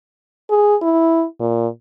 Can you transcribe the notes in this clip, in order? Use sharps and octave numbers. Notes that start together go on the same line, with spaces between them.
G#4
E4
A#2